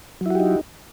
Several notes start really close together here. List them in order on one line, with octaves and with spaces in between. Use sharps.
F#3 E4 F#4 G4 D#4